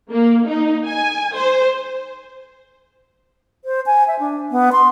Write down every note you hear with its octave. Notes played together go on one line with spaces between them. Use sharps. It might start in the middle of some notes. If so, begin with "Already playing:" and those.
A#3
D#4
G#5
C5
C5
G#5
E5
D4
B3
C6